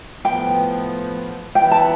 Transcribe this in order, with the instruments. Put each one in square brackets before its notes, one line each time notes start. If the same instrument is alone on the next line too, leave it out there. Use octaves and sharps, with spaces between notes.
[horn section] A2 F3 B3 [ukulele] G5
[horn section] E3 B3 E4 [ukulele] G5
[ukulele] A5